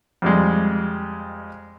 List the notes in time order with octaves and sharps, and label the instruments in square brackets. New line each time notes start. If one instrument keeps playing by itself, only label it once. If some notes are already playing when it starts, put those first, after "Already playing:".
[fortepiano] F2 G3 G#3